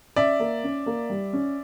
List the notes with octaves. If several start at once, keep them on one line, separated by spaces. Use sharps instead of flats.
C#4 D5 E5
A#3
C#4
A#3
G3
C#4